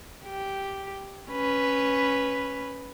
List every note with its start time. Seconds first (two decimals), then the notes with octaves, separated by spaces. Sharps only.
0.25 G4
1.30 C#4 B4